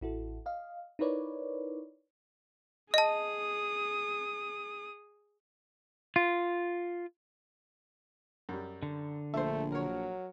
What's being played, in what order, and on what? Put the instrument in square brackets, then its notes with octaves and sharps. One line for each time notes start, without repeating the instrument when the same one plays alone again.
[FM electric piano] A1 E4 F#4 A4
D#5 F5
D#4 E4 A#4 B4 C#5 D5
[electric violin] G#4 D#6 [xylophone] D#5 A5
[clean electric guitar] F4
[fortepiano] F#2 G3
[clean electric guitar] D3
[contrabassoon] A#1 [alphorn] A3 [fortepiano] C5 E5
[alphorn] F#3 [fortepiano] A#4 C#5